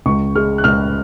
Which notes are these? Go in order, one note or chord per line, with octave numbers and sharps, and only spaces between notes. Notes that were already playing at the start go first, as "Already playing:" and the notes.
C#2 C#6
G#3 F6
F#6
C#2 F6